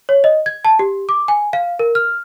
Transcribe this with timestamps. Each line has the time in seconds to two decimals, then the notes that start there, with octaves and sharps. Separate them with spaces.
0.09 C#5
0.24 D#5
0.46 G#6
0.65 A5
0.79 G4
1.09 D6
1.28 G#5
1.53 F5
1.79 A#4
1.95 F6